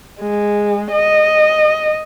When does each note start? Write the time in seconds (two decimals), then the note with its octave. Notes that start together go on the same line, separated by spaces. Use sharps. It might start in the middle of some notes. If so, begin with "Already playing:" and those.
0.21 G#3
0.92 D#5